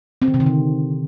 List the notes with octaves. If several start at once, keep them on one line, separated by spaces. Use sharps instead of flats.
C4
D#3
C3
D#3
D3